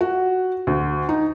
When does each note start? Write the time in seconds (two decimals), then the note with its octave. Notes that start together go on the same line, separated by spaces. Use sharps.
0.01 F#4
0.67 D2
1.09 D#4